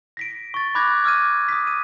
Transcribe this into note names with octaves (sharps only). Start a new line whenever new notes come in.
A#6 B6 D7
C#6 A6
B5 D6 F#6 G#6 A#6
D6 E6 F6 G#6 D#7
D#6 B6
D#7